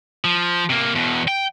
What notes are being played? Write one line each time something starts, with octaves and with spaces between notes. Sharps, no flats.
F3
C3 A#3
E2 B2
G5